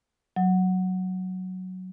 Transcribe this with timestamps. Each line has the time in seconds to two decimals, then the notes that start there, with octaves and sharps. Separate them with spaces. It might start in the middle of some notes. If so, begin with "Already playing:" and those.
0.36 F#3